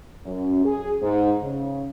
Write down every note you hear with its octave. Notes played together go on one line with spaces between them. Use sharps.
F#2
G#4
G#2
C#3